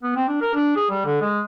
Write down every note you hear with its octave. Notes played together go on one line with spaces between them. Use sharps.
B3
C4
D4
A#4
D4
G#4
G3
D3
G#3